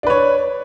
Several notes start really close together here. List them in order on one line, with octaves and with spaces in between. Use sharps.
D4 B4 C#5